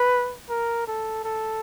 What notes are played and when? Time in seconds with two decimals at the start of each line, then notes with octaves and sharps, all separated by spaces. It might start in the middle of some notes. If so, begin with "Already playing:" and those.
Already playing: B4
0.49 A#4
0.87 A4
1.25 A4